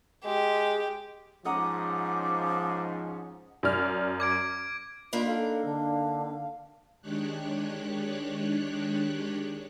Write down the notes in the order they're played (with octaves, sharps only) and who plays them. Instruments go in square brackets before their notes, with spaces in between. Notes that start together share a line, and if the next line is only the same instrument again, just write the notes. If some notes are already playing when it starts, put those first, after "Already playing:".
[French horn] G#3 [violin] G4
[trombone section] G#2 F3 [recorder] C#4 [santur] D#5 F#5 A#5 [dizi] D6
[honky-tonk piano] F#2 D5 F6
[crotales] D6 G#6 D7
[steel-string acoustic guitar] A#3 D4 D#4 [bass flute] F4 [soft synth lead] B5
[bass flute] A4 [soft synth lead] F5
[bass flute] D3
[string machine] D#3 G#3 D4 G4 C#5 F#6